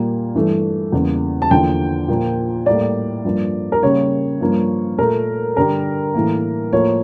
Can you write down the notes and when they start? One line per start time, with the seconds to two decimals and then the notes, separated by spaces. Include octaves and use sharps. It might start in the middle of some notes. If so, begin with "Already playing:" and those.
Already playing: A#2 G3 A#3
0.35 G2 E3 A3
0.92 E2 C#3 G3 A#3
1.42 A5
1.51 E2 D3 F3 A#3 G5
2.08 A#2 F3 A#3
2.66 A2 G3 A#3 D5
3.25 G2 F3 A#3
3.72 A#4
3.83 C#3 G3 A#3 C#5
4.41 G2 F3 A#3
4.98 A#2 A3 A#4
5.57 G2 D3 G3 A#4
6.14 A2 E3 A#3
6.73 A2 F3 A#3 C#5